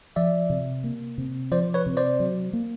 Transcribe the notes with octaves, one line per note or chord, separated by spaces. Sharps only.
F3 D5 E5
C3
A#3
C3
F3 C5 D5
B4 C#5
C3
C5 D5
F#3
A#3